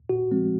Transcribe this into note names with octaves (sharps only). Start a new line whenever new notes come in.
A#2 F#4
F3 G#3 C4